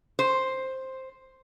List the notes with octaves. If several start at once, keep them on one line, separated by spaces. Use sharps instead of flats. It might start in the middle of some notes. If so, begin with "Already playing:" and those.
C5